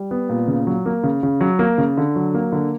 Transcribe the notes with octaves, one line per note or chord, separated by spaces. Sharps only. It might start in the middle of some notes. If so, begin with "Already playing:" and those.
Already playing: G3
B3
A#2
C#3
F#3
A#3
C#3
C#3
F#3
A#3
C#3
D3
F#3
A#3
D3